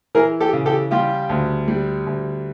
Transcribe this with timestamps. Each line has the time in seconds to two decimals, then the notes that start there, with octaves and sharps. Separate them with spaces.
0.15 E3 G#4 A#4
0.40 G4 A4
0.53 C#3
0.66 G4 A4
0.91 G3 F4 G4
1.29 D2
1.68 G3
2.06 D2